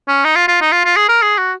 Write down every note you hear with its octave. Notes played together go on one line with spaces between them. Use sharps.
C#4
D#4
F4
F4
D#4
F4
F4
G#4
A#4
G#4
F#4